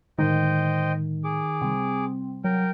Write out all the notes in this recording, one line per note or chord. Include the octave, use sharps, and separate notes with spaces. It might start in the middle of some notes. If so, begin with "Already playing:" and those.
A2 D3 D#3 G#3 C5 D#5 G5
G#4 D6
C3 G3 C4
F#3 A#4 G5